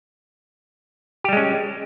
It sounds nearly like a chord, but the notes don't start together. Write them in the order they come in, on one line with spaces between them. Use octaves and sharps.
G4 G3 G#3 C#4